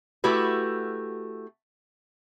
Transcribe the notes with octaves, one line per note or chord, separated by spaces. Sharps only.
A3 E4 F#4 G4 B4